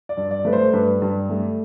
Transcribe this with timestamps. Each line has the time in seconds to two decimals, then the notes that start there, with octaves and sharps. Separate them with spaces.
0.09 D5
0.17 G2
0.31 D5
0.45 A3 B4
0.53 C5
0.73 G2 B4
1.02 G2
1.29 A3